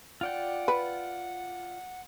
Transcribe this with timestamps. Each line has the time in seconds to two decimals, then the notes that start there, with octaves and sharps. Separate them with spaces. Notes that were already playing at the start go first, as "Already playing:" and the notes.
0.21 F4 D5 F#5 G5
0.68 B4